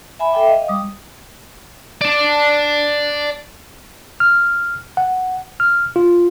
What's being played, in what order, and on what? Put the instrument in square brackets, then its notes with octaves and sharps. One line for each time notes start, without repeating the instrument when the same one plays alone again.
[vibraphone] E5 G#5 B5
A4 E5 G5 D6
D#5 F5
G3 D6 D#6
[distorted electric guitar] D5 A5
[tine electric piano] F6
F#5
F6
F4